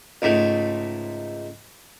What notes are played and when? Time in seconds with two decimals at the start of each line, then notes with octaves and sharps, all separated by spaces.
0.22 C#2 G#2 A3